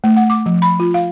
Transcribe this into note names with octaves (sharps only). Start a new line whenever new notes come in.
A3
F#5
D6
F3
B5
F4
F5